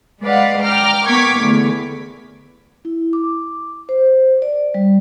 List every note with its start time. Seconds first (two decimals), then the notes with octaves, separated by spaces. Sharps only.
0.22 G#3 B4 D5 F5 F#5
0.63 G5 A#5 D6 F6
1.07 B3 A#4 C#6 D6 G#6 B6
1.37 E2 D3 A3
2.85 E4
3.13 D6
3.89 C5
4.42 D5
4.74 G3